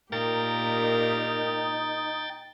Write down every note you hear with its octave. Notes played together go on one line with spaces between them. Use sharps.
A#2 D#4 G4 A#4 G5 A6